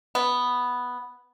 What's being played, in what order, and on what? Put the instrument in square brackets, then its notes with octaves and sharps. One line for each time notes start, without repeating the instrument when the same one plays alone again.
[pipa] B3